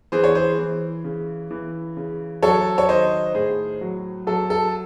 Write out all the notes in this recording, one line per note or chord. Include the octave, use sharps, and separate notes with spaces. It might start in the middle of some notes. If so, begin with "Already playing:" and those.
E3 G#4 C5
C#5
G#4 C5
E3
C#3
E3
C#3
F#3 A4 C#5
C#5
D#3 C5 D#5
A2 G#4 C5
F#3
F#3 A4
A4